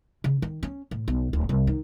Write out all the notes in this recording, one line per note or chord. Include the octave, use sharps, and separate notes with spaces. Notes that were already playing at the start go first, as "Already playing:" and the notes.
C#3
D#3
C#4
A2
B1
D1
C2
D#3